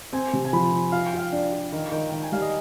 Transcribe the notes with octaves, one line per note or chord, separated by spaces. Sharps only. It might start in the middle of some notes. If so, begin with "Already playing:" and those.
C4 G#5
C3
G#5
F3 B5
F3
F4 F5
G5
F4
F5
D4
F4
D#3
D#3 G5
D#3 G5
G#5
G3 F5
D#5